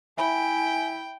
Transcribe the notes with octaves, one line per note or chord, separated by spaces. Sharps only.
E4 E5 G5 G#5 B5